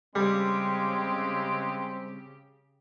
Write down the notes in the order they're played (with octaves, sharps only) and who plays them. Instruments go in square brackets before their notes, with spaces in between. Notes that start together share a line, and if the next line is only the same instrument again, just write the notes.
[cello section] C#3 G4 [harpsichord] G3 [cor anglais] G#3 [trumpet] C4